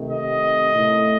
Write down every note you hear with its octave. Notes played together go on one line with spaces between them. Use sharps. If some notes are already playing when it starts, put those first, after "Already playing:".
Already playing: C3 D#3 A3
D#5
A2 A3